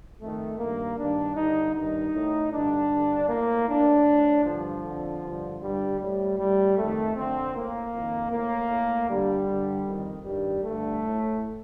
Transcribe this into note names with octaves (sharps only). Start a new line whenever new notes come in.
F2 D#3 A3
G2 D#3 A#3
G2 D#3 D4
G2 D3 D#4
G2 D#3 D#4
A2
G2 D3 D4
G2 D3
A2 A#3
A2 D4
A2
G2 D3 F3
F2 D3
G2 D3
G2 D3 G3
A2 G3
A2 G3
F2 D#3 A3
F2 D3 C4
A2 A#3
F2 D#3
A2 A#3
A2
G2 D3 G3
G2 D3
F2 D#3
G2 D#3 G3
G2 D3 A3
A2